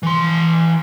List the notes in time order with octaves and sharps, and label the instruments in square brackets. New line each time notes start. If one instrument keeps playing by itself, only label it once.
[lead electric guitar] E3 C6